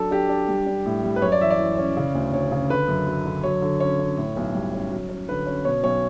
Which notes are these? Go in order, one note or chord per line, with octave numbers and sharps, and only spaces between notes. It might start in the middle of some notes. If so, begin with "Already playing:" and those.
Already playing: F#3 D4 A4
D4 G4
D4
G3
D4
A2
G3
B4
F#2 C#5
D5
E3 E5
D5
E3
C#4
C#3
D2
D2 C#5
C#3
D3 B4
F#2
F#3
D3
F#3 C#5
D3
C#4 C#5
C#4
A2
B1
G3
C#4
F#3
C#4
D3 B4
C#4
B2 C#5
B1 C#5